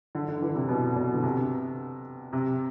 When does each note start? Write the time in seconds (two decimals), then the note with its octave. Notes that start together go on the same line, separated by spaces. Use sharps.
0.15 D3
0.28 D3
0.42 E3
0.55 C3
0.68 B2
0.96 B2
1.14 D3
1.23 C3
2.33 C3